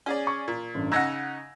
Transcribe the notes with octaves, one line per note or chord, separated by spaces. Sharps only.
C#4 G#4 D5
C#6
A#2
A1 G2
C#3 D#4 F#5 E6 G#6 A#6